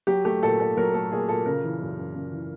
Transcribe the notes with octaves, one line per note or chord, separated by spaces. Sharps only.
F#3 G4
A3 G4
A#2 A4
A#2 A4
F#3 A#4
A3 A4
A#2 G#4
A#2 A4
C#3 A#4
E3
F#2
F#2
C#3
E3